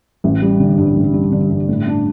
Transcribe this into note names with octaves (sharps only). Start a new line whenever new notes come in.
A1
G3
D3
G2
A1
G3
D3
G2
A2
D4